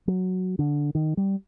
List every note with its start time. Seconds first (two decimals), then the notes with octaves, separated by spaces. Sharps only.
0.08 F#3
0.59 D3
0.95 D#3
1.17 G3